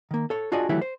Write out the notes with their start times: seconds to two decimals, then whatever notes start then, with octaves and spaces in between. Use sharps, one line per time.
0.11 D#3 A#3
0.30 A4 C#5
0.52 D4 F4 F#4 G#4 D5 D#5
0.69 D#3 E3 F#3 A3 E4 G4
0.81 C5